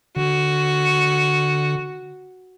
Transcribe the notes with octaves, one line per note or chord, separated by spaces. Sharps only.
D3 F#4